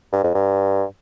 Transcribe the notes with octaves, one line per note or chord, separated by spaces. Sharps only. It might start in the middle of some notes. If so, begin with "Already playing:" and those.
G2
F2
G2